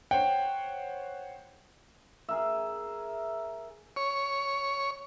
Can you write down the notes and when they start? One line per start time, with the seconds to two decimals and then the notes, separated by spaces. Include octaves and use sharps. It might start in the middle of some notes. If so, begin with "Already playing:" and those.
0.11 C5 C#5 F#5 G5
2.29 G#4 A#4 E5
3.96 C#5